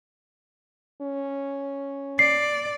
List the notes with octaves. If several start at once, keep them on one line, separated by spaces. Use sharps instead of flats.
C#4
D5 C7